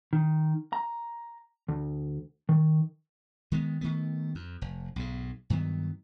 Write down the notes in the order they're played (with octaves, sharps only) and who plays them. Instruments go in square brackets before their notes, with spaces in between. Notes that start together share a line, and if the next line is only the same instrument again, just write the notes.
[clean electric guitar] D#3
A#5
D2
D#3
[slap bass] D#3 G#3 B3
D#3 A3 B3
F2
F1
B1 G#2
G2 D#3 F#3 B3